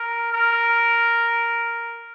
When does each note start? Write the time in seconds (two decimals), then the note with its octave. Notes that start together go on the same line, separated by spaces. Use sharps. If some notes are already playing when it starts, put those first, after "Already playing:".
Already playing: A#4
0.32 A#4